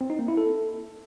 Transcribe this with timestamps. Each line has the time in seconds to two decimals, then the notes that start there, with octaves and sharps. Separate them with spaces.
0.01 C4
0.10 D#4
0.19 A#3
0.28 E4
0.37 A4